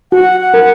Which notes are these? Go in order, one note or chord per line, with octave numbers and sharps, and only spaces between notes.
F#4 F#5
F#5
A#4